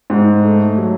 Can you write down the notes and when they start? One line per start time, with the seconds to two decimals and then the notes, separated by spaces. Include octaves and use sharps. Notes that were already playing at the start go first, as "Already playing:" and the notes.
0.10 G#2
0.44 A3
0.77 F#3